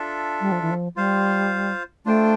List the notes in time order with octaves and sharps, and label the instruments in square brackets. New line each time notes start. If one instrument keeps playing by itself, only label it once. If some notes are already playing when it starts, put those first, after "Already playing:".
Already playing: [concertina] D4 F4 A4 E5
[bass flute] G3
F3
E3
F3
[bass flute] G3 [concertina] F4 C5 F5
[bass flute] A3 [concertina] D4 F4 C5 G5